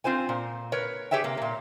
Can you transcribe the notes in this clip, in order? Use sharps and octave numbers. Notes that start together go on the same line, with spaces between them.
C4 F4 C5 G#5
A#2
A#4 B4 C#5
G4 G#4 C#5 E5 G5
C3 A#3
A#2 A#3